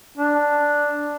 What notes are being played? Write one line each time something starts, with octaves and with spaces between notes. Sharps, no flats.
D4